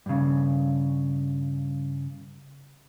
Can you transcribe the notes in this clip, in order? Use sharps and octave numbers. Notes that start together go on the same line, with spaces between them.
G2 C#3